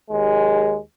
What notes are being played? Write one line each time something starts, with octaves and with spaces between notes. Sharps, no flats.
D#2 G#3